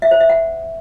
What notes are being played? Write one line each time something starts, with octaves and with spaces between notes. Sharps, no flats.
E5
C5
E5
F#5